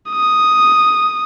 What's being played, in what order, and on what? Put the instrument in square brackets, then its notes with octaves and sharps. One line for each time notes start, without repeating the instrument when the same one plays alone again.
[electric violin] D#6